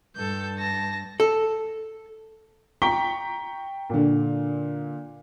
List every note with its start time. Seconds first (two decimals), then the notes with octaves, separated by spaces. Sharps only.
0.16 G2 A4 G6
0.58 A5 A#6
1.20 A4
2.82 G5 A#5 C#6 B6 G7
3.90 A#2 D3